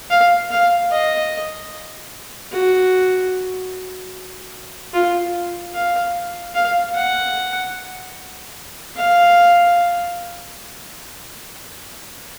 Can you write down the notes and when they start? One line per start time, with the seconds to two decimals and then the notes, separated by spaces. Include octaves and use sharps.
0.10 F5
0.51 F5
0.91 D#5
2.52 F#4
4.94 F4
5.74 F5
6.55 F5
6.95 F#5
8.96 F5